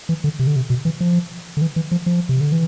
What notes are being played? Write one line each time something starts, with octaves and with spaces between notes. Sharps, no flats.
E3
D3
C3
D3
C3
B2
E3
F3
D3
E3
E3
F3
F3
C3
D3
E3